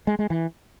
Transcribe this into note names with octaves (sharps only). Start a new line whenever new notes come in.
G#3
G#3
E3